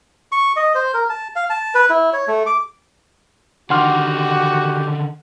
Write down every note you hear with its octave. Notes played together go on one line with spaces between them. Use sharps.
C#6
D#5
C5
A#4
A5
F5
A5
B4
E4
C#5
A3
D6
D3 D#3 F#4 G4 F#5 C6 F6